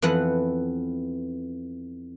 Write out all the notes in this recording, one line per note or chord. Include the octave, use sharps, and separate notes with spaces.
F2 E3 B3 F#5